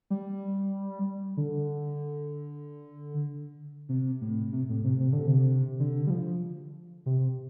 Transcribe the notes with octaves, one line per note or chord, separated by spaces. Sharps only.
G3
D3
C3
A2
C3
A2
C3
C3
D3
C3
D3
G3
F3
C3